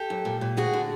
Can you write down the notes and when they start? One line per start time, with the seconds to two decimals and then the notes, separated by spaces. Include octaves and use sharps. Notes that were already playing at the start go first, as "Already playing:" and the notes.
Already playing: G4 A4
0.10 F#2
0.25 A#2
0.41 A#2
0.57 D2 F#4 G#4
0.73 D3